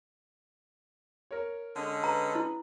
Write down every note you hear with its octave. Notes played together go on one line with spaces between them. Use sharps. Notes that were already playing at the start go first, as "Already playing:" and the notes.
A#4 C#5
D3 G#3 C#4
B4 A#5
E4